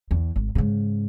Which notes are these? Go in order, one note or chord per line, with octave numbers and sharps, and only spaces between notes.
E2
G#1
G#2 C#3